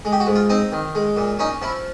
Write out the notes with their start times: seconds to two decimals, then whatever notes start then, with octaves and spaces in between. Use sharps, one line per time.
0.05 G#3
0.13 G4
0.20 F#4
0.27 G#2
0.35 F4
0.50 C4 D#4
0.72 D#3
0.95 G#3
1.17 A#2
1.39 C#4 D#4
1.62 F3 E4